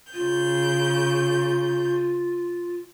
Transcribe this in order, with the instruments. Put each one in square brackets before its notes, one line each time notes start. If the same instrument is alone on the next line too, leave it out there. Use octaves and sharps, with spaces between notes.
[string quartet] C#3 G6 [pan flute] F4